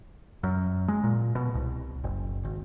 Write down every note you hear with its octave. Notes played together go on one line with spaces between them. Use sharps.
F#2
G#3
A#2
B2
C2
F#1
G#1